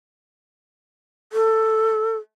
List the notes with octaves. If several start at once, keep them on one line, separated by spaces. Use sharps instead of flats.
A4